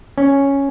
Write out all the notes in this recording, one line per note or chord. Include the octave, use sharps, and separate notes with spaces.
C#4